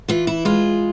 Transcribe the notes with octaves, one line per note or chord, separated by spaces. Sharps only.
E3 F4
E4
G#3 F4